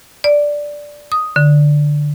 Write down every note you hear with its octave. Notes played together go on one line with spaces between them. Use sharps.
D5
D#6
D3